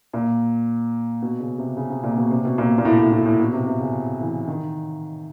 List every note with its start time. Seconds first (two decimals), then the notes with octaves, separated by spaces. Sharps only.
0.13 A#2
1.22 B2
1.40 C#3
1.58 C3
1.77 C#3
1.90 C3
2.03 A#2
2.17 B2
2.31 C3
2.45 B2
2.58 A#2
2.78 A#2
2.85 A2
2.98 A2
3.12 A2
3.26 A2
3.39 B2
3.53 C3
3.67 C3
3.80 C#3
4.21 E3
4.48 D#3